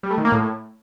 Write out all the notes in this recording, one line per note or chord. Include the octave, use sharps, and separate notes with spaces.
G3
A3
D#3
A#3
A2